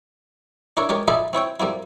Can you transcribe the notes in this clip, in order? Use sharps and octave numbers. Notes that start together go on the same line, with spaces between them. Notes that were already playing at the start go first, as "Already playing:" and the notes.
D4 E4 A#4 C#5
G#3 C#4 G4 A#4 C#5
D#4 F4 G#4 D5 E5 B5
C4 E4 C#5 G5
G3 A#3 C4 E4